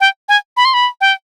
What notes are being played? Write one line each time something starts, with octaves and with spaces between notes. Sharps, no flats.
G5
G#5
B5
C6
B5
G5